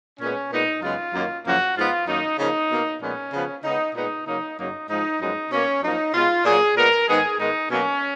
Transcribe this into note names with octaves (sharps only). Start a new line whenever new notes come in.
A#2 G#3 B3 C#4
A#2 G#3 B3 D#4
F#2 C#3 G#3 B3 F4
F#2 D#3 F#3 A#3
F#2 C#3 F3 A#3 F#4
G#2 F3 G#3 B3 F4
F#2 D#3 A#3 D#4
C#3 F3 A#3 D#4
B2 A#3
A#2 F3 G#3 B3 C#4
C#3 F3 B3
C#3 G#3 B3 D#4
A#2 G#3 B3 D#4
C#3 F#3 A#3 D#4
F#2 C#3 F#3 A#3 D#4
G#2 F3 G#3 D#4
F#2 F3 G#3 B3 D#4
B2 A#3 C#4
F#2 F3 A#3 D#4
B2 G#3 B3 F4
A#2 F#3 A#3 G#4
A#2 G#3 B3 A#4
G#2 D#3 G#3 B3 G#4
G#2 D#3 G#3 B3 D#4
B2 F#3 A#3 C#4